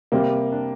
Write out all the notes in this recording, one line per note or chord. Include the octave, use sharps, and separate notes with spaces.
C3 G3 A#3 C4 G4
D4